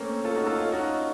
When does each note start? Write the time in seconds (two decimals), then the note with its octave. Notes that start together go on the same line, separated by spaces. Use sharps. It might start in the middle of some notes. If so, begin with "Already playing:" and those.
Already playing: A3 A#3 C4 C#4
0.24 F4 A4
0.35 D#4 F#4
0.47 F4 A4
0.58 C#4 F4
0.72 D#4 F#4